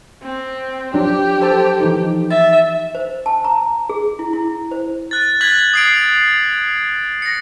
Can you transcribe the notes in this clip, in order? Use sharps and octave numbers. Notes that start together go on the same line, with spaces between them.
C4
F3 F#3 D4 G4
A4 C5 A5
E3 F3 D#4
E5 A6
C5
A5
A#5
G#4
E4
E4
C5
F#6 A6
F#6 G#6 A6 B6 F#7
D#6 C7 D7
A#6 C#7